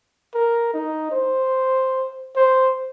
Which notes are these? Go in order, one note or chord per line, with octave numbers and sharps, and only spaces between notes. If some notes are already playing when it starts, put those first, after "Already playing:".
A#4
D#4
C5
C5